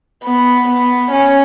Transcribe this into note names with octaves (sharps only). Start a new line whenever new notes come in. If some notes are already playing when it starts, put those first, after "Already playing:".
B3
B3
C#4